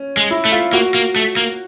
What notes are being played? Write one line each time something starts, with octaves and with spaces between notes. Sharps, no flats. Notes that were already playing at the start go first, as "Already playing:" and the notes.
Already playing: C#4
G#3
E4
A3
F4
A#3 F#4
A#3
A3
A#3